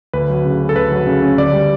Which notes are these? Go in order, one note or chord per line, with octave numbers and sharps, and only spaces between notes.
D2 B4
F#3
C#3
C#4
A4
D2 B4
F#3
C#3
C#4
D2 D5
G3